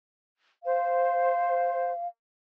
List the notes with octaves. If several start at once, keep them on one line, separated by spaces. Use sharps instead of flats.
C5 F5